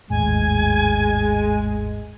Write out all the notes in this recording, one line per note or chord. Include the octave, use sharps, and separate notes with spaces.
G#1 D#2 A2 G#3 G#5